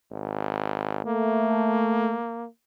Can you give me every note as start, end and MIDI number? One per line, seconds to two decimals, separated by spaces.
0.11 1.01 32
1.06 2.14 57
1.06 2.45 58